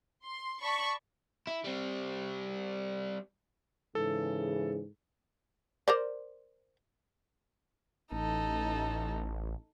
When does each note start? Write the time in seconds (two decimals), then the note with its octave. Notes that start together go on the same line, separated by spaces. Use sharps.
0.23 C6
0.61 D5 A5 B5 C#6
1.47 E4
1.65 G3 C4
3.95 G#2 C#3 E3 G#4 A4
5.88 A#4 C5 D5
8.12 A1 D#4 A4